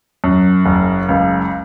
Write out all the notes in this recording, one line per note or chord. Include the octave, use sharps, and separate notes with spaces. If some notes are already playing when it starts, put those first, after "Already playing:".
F#2
F#1
C#2